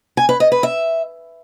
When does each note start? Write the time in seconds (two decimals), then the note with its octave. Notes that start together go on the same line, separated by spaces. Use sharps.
0.17 G#5
0.29 B4
0.40 D#5
0.52 B4
0.63 E5